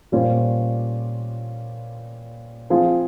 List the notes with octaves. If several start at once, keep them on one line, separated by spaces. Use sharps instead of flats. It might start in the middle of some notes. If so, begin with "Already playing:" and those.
A#2 G3 C#4 F4 C5
F3 C4 F4 G#4